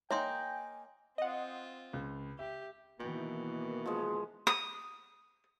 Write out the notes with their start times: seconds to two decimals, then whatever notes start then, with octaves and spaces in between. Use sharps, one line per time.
0.11 A#3 D#4 C#5 E5 G5 G#5 C6
1.18 C4 F4 D#5 F#5
1.93 C#2
2.39 G4 E5
3.00 B2 D#3 E3 A#3 G5
3.86 F3 G#3
4.47 D#6